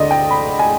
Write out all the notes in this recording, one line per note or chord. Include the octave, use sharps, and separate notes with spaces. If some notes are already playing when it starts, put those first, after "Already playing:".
Already playing: D2 D3 D5 D#5
G5
B5
G#5